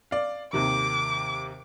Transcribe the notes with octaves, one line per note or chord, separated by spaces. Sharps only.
D5 F5
D#2 C3 D#3 D6